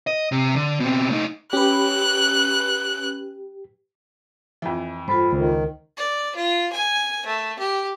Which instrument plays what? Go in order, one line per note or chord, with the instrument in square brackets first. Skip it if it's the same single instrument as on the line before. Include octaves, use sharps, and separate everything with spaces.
[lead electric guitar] D#5
C3
D3
B2 C4
A3 D#4
[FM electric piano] C#4 B4 [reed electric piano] G4 [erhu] F#6
[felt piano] F2 E3
[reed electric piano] G2 B5 [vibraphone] F4 A4 C5
[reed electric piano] C#2 [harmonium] D#3
[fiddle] D5
F4
G#5
A3
G4